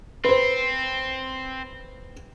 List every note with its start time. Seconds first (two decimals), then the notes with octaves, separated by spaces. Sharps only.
0.25 C4 B4 C5